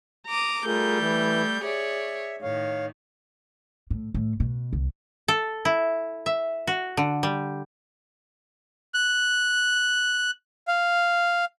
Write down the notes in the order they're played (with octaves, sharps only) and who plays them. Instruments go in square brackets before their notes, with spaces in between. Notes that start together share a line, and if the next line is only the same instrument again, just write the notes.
[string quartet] A#5 D6 D#6
[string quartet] G3 A3 G6 [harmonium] F4 G#4 A#4
[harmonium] E3
[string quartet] G#4 C#5 D5 [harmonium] E5
[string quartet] A2 D#3 [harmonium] C#5 F5
[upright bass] A2
A2
B2
C2
[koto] A4
E4
E5
F#4
D3
G3
[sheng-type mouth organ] F#6
F5